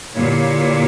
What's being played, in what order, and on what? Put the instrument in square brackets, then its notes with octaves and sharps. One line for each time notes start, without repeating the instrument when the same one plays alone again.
[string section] A#2 [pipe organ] D3 A#3 E4 G4 C#5